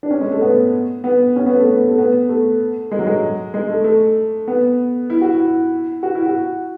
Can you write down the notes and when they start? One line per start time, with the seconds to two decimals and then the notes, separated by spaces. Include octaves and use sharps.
0.03 D4
0.11 C#4
0.21 G#3
0.32 A3
0.41 B3
1.04 B3
1.36 C#4
1.46 B3
1.57 A3
1.67 B3
1.88 A3
1.98 B3
2.29 A3
2.91 G#3
2.99 F#3
3.07 G#3
3.54 G#3
3.69 A3
3.84 A3
4.48 B3
5.10 E4
5.21 F#4
5.35 E4
6.03 F#4
6.15 E4
6.26 F#4